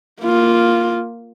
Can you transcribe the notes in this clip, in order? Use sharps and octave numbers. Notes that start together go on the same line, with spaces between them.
A#3 F4